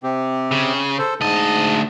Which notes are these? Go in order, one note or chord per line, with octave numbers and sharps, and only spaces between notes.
C3 C4 G4
C#3
A4 C5
D2 G#2 D#5 A5